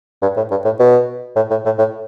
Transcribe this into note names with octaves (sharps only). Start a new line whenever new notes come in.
G2
A2
G2
A2
B2
A2
A2
A2
A2